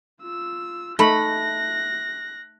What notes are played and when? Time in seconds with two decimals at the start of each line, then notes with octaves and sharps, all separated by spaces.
0.22 F4 E6
0.99 A3 D#4 B5 F#6 A#6